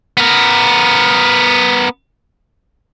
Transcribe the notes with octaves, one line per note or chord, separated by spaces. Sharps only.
B3 A#4